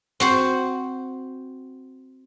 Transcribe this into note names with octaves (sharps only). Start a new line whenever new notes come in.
C4 F#4 C5